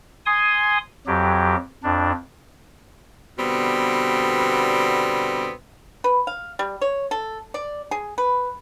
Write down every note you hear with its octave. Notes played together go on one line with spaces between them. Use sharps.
G#5 C6 D#6
F2 F#3 G4
F2 D4
B2 D3 G3 B3 C4
B4
F5
G3
C#5
A4
D5
G#4
B4